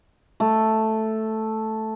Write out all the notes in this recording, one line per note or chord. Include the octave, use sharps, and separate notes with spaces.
A3